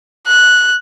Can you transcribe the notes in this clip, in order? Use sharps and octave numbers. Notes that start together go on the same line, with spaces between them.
F#6